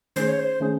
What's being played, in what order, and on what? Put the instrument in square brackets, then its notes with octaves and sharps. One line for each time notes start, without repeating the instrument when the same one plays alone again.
[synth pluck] D#3 A3 C#4 G#4 [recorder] C5
[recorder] C#5
C5
[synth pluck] D#3 A3 C#4 G#4